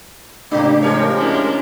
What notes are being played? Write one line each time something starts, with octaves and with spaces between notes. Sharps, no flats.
A2 C#3 A#3 D4 G4
F3 G#3 G4 A#4 C#5
C#4 D4 E4